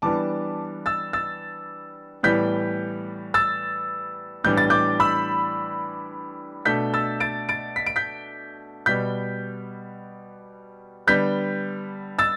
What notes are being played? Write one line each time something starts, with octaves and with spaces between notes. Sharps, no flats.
E3 G3 B3 D4 A5 D6
E6 A6
E6 A6
A2 E3 G3 B3 G6 B6
E6 A6
A2 E3 G3 B3 D4 G6
A6
D6 G6
B5 E6
B2 A3 D4 G6 B6
E6 A6
A6 D7
A6 D7
B6
D7
G6 B6
B2 G3 B3 G6 B6
D3 G3 B3 G6 B6
E6 A6